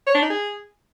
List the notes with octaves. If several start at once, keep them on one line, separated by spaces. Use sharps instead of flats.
C#5
D4
D#4
G#4